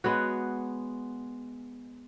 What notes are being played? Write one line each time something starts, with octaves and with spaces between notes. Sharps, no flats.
G#3 B3 F#4 C#5